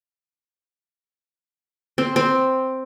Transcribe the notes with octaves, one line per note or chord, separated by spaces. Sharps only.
C4
C4